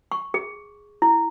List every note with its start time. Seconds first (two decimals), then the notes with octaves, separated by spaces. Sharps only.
0.12 C#6
0.34 G#4
1.02 E4